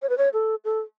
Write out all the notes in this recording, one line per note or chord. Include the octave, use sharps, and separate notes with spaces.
C#5
B4
C#5
A4
A4